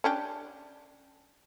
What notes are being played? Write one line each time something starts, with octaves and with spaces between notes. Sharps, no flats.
C#4 D4 G4